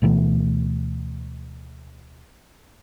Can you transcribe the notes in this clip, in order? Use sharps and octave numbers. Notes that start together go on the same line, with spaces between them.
D2 B2 E3 A3